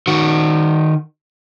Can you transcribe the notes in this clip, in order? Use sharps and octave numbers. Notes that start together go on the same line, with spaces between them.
D#3 F#4